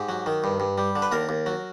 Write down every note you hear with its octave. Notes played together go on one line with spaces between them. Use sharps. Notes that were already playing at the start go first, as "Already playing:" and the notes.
Already playing: G#2 G4
F#3
D#3
G2
G2
G3
D3
B4
D#2 A#4
D#2
F#3